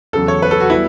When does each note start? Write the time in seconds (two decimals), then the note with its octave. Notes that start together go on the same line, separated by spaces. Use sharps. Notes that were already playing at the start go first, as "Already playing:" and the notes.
0.13 E2 C#3 F#3 A4
0.28 C#5
0.42 B4
0.51 A4
0.60 F#4
0.70 G3 B3 E4